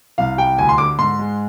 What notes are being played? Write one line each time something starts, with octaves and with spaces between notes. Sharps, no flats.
C2 F5
G3 G5
D2 G#5
C6
D3 D6
G#2 C6
G#3